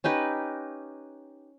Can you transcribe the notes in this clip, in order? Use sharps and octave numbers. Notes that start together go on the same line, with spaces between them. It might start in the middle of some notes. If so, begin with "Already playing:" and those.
C#4 D#4 G4 B4